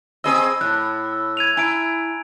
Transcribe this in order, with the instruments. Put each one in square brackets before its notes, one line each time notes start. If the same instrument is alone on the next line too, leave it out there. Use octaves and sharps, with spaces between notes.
[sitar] C4 G#4 D#5 [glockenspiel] B5 E6
[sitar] A2 [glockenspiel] F#6
[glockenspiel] E6
G#6 D#7 F7
[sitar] E4 [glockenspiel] G#5 A#5 D7